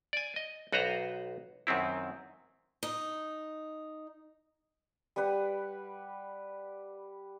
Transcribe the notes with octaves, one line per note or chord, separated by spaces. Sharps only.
D5 G#5
D#5
B1 F#4 B4 C5 A#5
F#2 D#3 C4 E4
D#4
G3 G4 B4 F#5